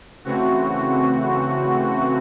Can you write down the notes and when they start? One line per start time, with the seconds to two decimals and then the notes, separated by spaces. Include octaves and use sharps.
0.25 C#3 E3 A3 C4 F#4